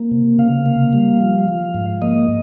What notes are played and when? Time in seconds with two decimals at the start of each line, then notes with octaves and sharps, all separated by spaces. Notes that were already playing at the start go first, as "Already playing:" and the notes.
Already playing: A#3
0.12 C3
0.39 C#3 F5
0.66 A#3
0.93 G3
1.21 F3
1.48 F3
1.74 G#2
2.02 A#3 D#5